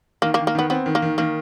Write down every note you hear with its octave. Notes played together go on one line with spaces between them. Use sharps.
D#3 A#3
A#3
D#3
A#3
D#3 B3
B3 C4
D#3
A#3
D#3
D#3 A#3